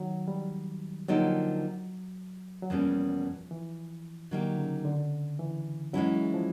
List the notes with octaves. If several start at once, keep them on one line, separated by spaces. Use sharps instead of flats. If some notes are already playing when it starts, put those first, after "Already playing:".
Already playing: D#3 F#3
G3
D3 F3 F#3 A#3 D#4 G4
F#3
E2 B2 F3 G3 A#3 C#4
E3
D3 F#3 A#3 D#4 G4
C#3
D3
E3
E3 F#3 G#3 C#4 E4
F3